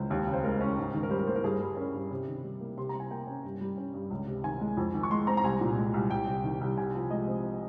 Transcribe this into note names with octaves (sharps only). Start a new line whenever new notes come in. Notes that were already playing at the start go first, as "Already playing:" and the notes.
Already playing: C#2 C5
D#2
C#3
C5
G#3 A#4
C#4
G#2
D#3
A#4
G3 C5
A#4
A#3 C5
A#4
G2 G#4
G3
C#4 A#4
G2
C3
D#3
G3
A#3
C3 C6
A#5
G3
G#5
A#3 G5
C#4
G2
G3
C#4
G2
C#2
C3
D#3 G#5
G#3
F2
D#3
C#6
G#3 C6
C4 A#5
A#5
C2 G#5
A#2
G#3
C2
C2 G5
C3
D#3
C2
C3 G#5
F3
G#3 D#5
C4